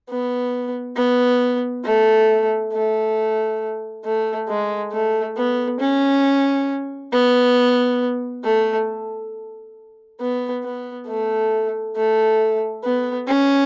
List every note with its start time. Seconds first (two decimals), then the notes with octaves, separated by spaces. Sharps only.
0.09 B3
0.96 B3
1.85 A3
2.73 A3
4.04 A3
4.48 G#3
4.92 A3
5.37 B3
5.80 C#4
7.12 B3
8.44 A3
10.20 B3
10.64 B3
11.07 A3
11.96 A3
12.84 B3
13.27 C#4